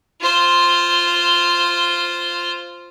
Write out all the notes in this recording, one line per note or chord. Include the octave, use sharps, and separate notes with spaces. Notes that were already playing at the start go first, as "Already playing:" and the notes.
F4 C5